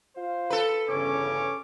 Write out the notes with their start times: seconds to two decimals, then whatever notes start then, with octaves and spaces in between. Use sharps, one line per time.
0.16 F4 C5 F5
0.50 A4 B4
0.88 G1 E2 C#3 C#4 C#5 D6